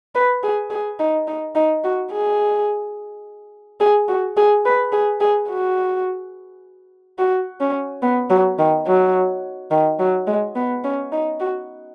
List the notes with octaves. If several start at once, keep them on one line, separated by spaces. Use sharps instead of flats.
B4
G#4
G#4
D#4
D#4
D#4
F#4
G#4
G#4
F#4
G#4
B4
G#4
G#4
F#4
F#4
C#4
B3
F#3
D#3
F#3
D#3
F#3
G#3
B3
C#4
D#4
F#4